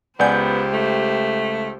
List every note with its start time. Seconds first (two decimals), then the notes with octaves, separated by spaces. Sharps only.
0.20 C#2 B3 G4 C5 D5 F#5 G#5 G6
0.73 A3